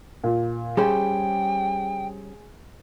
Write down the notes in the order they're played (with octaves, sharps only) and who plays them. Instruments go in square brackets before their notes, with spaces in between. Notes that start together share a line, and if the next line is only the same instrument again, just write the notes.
[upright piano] A#2
[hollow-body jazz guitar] G3 C#4 C5 [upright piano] G#4 [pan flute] G5